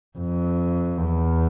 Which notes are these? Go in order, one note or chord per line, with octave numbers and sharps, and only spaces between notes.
F2
E2